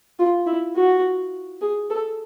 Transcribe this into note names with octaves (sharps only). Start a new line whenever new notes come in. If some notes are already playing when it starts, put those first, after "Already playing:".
F4
E4
F#4
G#4
A4